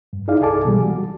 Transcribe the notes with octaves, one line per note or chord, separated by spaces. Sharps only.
G2
D#4 E4 G#4 D5 F5
C2 G#4 A4 G#5 A5 D6
B2 E3 G3
F#4